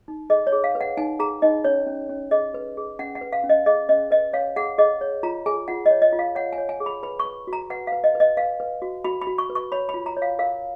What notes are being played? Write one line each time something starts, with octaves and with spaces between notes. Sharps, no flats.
D#4
G#4 D#5
C#5
G#4
F5
B4
F#5
D#4 G#5
G#4 A#5
D#4 D#5
C#4 C#5
C#4
C#4
G#4 D#5
B4
G#4
C#4 F#5
F#5
B4
F5
C#4
D#5
G#4 D#5
C#4 D#5
B4 D#5
C#5 F5
G#4 F#5
G#4 D#5
C#5
F4 A#5
G#4 G#5
F4 F#5
D#5
C#5
D#5
F4
F5
C#5 F#5
G#5
C#5
G#5
G#4
B5
B4 B5
C#6
B4
F#4
A#5
B4 F#5
B4 F5
D#5
B4
D#5
B4 F5
B4
F#4
F#4 B5
B5
F#4
C#6
B4
C#6
C#5 B5
B5
F4
A#5
C#5
F5
A#4 F5